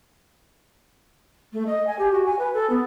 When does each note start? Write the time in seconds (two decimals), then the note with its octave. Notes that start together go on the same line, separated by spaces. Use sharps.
1.53 A3
1.67 D#5
1.87 G#5
1.99 G4
2.11 F#4
2.26 G#5
2.39 B4
2.54 A4
2.70 B3